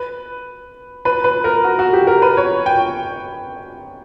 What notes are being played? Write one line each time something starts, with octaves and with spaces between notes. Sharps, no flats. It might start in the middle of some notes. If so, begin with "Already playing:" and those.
Already playing: B4
B4
B4
A#4
F#4
F#4
G4
A#4
B4
C#5
G5